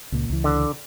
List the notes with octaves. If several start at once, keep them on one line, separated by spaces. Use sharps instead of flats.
C#2 A#2
C#2 E3
D3